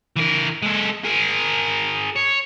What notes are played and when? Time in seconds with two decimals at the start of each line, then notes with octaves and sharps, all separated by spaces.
0.16 E3 A#4
0.62 G#3 A4
1.05 G#4 A#4
2.16 C#5